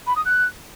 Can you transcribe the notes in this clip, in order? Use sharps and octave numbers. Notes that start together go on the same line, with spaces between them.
B5
D#6
F#6